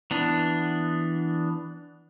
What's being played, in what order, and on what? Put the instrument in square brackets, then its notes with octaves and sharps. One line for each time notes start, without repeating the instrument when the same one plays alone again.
[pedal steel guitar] E3 B3 D4